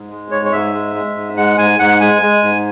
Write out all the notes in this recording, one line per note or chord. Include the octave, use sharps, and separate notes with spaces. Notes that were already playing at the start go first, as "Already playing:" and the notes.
Already playing: G#2
G#3
G#2 C#5
C#5
G#2 E5
G#3
G#3
G#2
G#3 F#5
G#2 G#5
G#2 F#5
G#3 G#5
G#3
G#2